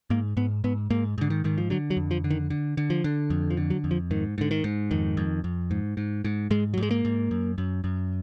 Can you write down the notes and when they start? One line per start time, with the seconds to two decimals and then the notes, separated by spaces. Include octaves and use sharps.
0.10 G#2 A#3
0.37 G#2 B3
0.64 G#2 B3
0.90 G#2 A#3
1.18 G#2 D3
1.30 D#3
1.44 G#2 D#3
1.58 F3
1.70 D3 F#3
1.90 F#3
1.97 F2
2.11 F3
2.24 D3
2.31 D#3
2.50 D3
2.77 D3
2.90 F3
3.04 D3
3.30 F2
3.50 F3
3.57 D3
3.70 F#3
3.84 F2
3.91 F3
4.11 G#2 D#3
4.38 G#2 D3
4.51 D#3
4.64 G#2
4.91 F2 D#3
5.17 F2
5.44 F2
5.71 G#2
5.97 G#2
6.25 G#2
6.51 G#2 G#3
6.74 F#3
6.77 G#2
6.83 G#3
6.91 A#3
7.05 G#2
7.31 F#2
7.58 F#2
7.84 F#2